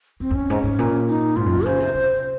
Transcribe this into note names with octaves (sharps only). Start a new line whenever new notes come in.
F2 C4
F2
F#2 C#4
G#2
G#2
A#2
D#4
G#2 F4
F#2
C3
C#3 C5
C3
C3